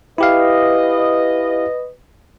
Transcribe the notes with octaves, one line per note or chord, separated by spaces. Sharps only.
E4 G4 B4 D#5 F5